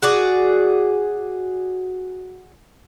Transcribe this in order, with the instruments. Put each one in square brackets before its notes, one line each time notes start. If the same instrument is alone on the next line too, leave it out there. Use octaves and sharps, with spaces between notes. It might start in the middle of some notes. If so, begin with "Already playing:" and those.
[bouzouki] F#4 G#4 D5